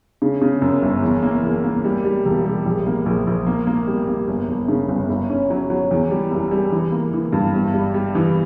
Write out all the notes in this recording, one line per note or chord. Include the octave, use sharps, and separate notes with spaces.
C#3
C#3
F#2
G1
E2
A#3
E2
A#3
G3
G3
E1
G3
A#1
A#3
A#1
A#1
A#3
A#3
G3
A#3
G1
G1
C#3
G1
G1
C#4
F#3
F#3
E2
G3
F#1
G3
E3
A#3
E3
G2
G1
G3
G3
E3